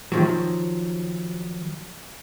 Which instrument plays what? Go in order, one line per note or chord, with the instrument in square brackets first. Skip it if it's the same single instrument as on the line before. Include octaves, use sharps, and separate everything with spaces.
[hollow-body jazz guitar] D#3 F3 F#3